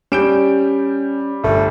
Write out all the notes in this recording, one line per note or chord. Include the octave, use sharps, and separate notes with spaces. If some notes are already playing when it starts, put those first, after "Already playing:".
G3 C#4 G6 D7 E7
G1 A3